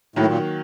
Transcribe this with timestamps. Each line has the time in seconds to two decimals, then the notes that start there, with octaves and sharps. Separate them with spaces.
0.16 A2 D#3 F#3 A#3
0.28 A#2